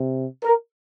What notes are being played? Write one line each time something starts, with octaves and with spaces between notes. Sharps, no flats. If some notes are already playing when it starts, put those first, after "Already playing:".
Already playing: C3
A#4